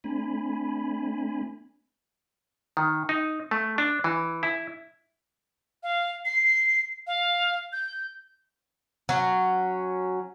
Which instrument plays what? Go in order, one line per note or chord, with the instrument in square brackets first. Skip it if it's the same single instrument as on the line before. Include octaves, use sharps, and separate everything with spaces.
[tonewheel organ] A3 C4 D4 G#5 B5
[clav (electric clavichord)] D#3
D#4
A3
D4
E3
E4
[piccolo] F5
C7
F5
G6
[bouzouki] F#3 C#4